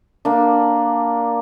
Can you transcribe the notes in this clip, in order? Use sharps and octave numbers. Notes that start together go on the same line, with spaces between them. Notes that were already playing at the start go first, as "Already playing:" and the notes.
A#3 D4